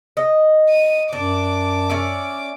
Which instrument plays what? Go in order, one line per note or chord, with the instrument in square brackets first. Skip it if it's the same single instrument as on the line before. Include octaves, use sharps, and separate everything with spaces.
[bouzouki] D#5
[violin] D#7
[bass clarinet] F#2 [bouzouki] D4 [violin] D6
[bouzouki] C#4 D5 E5